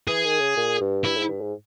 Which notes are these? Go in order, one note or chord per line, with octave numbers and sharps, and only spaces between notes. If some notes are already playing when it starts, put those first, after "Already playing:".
E3 G#4
D#3
C#3
A#2
G2
G2 E4
G#2
G2
G#2